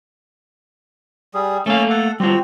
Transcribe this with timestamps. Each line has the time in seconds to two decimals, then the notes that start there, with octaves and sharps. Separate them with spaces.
1.34 G3 G#4
1.66 A3 A#3 C#4 A4 F5 E6
1.90 A4 F#5
2.20 G3 C4 F4 F#4